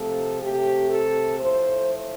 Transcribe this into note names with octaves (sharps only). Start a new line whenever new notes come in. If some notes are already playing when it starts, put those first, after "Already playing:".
Already playing: C3 F3 A3 A4
C3 A3 G4
A4
A2 F3 A3 C5